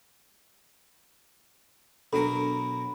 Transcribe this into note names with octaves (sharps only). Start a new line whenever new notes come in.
B2 F#3 D4 A4 A#4 B5